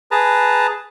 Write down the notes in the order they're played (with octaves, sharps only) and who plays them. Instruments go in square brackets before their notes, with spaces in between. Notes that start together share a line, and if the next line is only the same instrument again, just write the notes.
[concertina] G#4 B4 A5 A#5